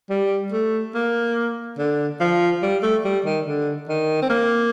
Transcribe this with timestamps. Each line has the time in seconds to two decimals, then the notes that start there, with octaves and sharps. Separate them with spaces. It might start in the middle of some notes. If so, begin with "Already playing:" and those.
0.10 G3
0.52 A3
0.95 A#3
1.78 D3
2.20 F3
2.62 G3
2.83 A3
3.05 G3
3.25 D#3
3.46 D3
3.88 D#3
4.22 C4
4.30 A#3